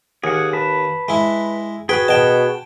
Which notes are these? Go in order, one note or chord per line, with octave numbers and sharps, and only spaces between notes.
D#2 G#4 F#5
B4 A5
G#3 E4
F#4 G#4 B4 G5
B2 G5 A5